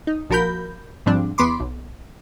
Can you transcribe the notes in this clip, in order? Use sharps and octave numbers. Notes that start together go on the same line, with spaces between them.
D#4
A#1 F3 F#4 A#4 B5 G6
G#2 F3 G3 C4 D4
E2 B3 B5 C6 D6
B1